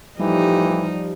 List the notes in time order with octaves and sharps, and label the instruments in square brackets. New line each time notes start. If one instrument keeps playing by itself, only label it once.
[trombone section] A2 E3 G4 [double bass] F3 [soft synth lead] G3 [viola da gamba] D#4